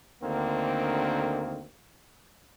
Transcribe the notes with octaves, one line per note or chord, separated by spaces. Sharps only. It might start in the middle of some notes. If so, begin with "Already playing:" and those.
D2 D3 D#3 A#3 C4